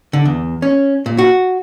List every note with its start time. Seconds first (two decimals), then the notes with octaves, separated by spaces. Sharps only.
0.13 D3
0.26 E2
0.62 C#4
1.06 A#2
1.18 F#4